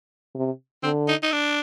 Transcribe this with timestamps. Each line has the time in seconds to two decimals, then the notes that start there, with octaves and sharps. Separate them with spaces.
0.35 C3
0.83 D3 C4
1.08 D#4
1.23 D#4
1.32 D4